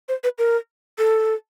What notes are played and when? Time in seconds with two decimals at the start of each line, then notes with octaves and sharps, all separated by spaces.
0.09 C5
0.24 B4
0.38 A#4
0.98 A4